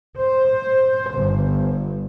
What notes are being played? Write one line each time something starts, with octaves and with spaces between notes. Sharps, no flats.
C5
G1